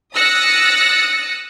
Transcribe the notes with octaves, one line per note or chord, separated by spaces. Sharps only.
D#6 E6 F#6 A6 A#6 C#7